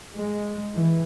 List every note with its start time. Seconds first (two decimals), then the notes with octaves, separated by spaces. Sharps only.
0.15 G#3
0.74 E3